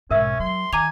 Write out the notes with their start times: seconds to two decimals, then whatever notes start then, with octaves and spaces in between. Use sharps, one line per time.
0.11 B1 G#2 C#4 A#4 E5 E6
0.40 F#3 C6
0.73 D#3 G#5 A#5 D6 F7